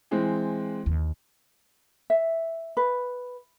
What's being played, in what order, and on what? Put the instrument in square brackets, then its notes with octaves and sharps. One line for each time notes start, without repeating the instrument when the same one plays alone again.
[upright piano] E3 G#3 C4
[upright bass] D#2 D3
[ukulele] E5
B4